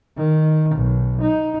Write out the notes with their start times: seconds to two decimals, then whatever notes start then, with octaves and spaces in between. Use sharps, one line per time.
0.17 D#3
0.75 B1
1.21 D#4